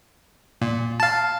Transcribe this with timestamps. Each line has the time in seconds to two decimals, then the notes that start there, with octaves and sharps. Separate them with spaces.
0.62 A#2
1.00 F5 A5